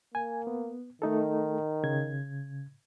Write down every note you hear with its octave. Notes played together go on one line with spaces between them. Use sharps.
A#3 G#5
B3
D#3 A3 D#4 A4
C#3 G#6